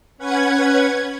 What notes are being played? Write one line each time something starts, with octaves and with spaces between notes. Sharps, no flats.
C#4 B4 F#5 G#6